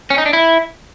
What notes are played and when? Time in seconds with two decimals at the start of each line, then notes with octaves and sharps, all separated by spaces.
0.10 C#4
0.18 D#4
0.26 D4
0.33 E4